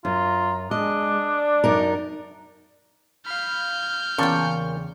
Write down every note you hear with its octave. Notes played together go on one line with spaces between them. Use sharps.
F#2 F4 A#5
G#3 D4 D#5
D5
F#2 D#4 A#4
F5 B5 F6 G6
E2 A#2 C#3 G5 A5 C#6